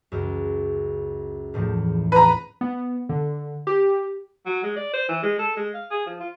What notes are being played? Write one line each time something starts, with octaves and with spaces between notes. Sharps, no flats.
C#2 F#2
E2 A2 F3
C4 B4 A#5
B3
D3
G4
F#3
G#3
D5
C5
E3
G#3
A4
G#3
F5
G#4
F3
F4